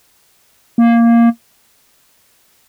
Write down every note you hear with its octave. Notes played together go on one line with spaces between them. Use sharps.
A#3